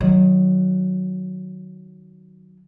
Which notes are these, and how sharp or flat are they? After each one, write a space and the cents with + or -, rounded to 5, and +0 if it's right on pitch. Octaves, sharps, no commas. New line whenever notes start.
D#3 -15 F#3 +0